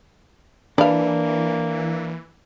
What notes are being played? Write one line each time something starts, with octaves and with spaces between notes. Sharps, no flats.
E3 A#3 D4 B4 F5